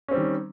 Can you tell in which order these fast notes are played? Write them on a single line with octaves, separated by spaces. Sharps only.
C#4 C4 G3 D#3